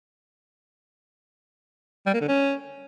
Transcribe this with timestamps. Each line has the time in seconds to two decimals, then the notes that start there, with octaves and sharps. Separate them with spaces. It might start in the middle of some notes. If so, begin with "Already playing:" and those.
2.07 G3
2.14 A#3
2.21 D3
2.28 C#4